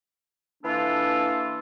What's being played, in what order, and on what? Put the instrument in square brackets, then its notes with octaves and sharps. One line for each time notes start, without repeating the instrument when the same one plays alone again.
[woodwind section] E3 A#3 D4 F4 A4